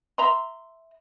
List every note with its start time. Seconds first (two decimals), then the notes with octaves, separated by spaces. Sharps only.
0.18 E5 A#5 C6